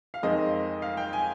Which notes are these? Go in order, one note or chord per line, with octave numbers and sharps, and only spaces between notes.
F5
F2 D#3 G#3 C4 D#5
F5
G5
G#5